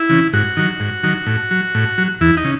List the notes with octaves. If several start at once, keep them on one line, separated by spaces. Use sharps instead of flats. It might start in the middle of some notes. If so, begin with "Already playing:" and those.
Already playing: E4
C#3 E3
G#2 F#4
D#3 F#3
G#2
D#3 F#3
A2
F#3
A2
F#3
E2 E4
D#4
C#3